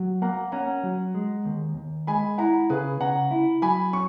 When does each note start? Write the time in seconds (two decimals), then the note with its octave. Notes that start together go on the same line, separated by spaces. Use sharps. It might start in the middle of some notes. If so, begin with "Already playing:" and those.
Already playing: F#3
0.22 A#3 F#5 A#5
0.52 C#4 F#5 A#5
0.83 F#3
1.15 G#3
1.45 D#2
1.77 D#2
2.07 G#3 G#5 B5
2.38 E4 F#5 A#5
2.70 C#3 G#4 B4
3.01 C#3 F#5 A#5
3.31 E4
3.62 F#3 G#5 B5
3.93 C#4 C#6